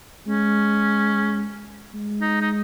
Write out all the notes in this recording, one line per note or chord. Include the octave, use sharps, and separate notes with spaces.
G#3 C#4
G#3
D#4
D#4